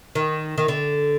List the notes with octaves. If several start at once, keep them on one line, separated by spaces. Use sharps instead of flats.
D#3
D#3
D3